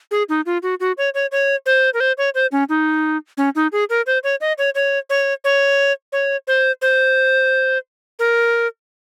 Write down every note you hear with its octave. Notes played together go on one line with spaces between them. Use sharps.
G#4
D#4
F4
F#4
F#4
C#5
C#5
C#5
C5
A#4
C5
C#5
C5
C#4
D#4
C#4
D#4
G#4
A#4
C5
C#5
D#5
C#5
C#5
C#5
C#5
C#5
C5
C5
A#4